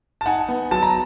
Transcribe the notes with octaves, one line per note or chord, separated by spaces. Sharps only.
A5
D#4 F#5 G#5
B3
F#3 A5
A#5